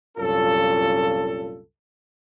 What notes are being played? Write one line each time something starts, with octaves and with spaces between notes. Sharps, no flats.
C2 F#2 A#2 C#4 F4 A4